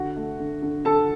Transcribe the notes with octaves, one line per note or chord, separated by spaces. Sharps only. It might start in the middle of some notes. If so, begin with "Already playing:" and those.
Already playing: D3 F#4 F#5
A3
D3
D3
D3 A4 A5